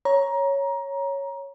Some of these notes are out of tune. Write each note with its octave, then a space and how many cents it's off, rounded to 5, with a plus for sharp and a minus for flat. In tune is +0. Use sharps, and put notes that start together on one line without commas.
C#5 +0 A#5 +20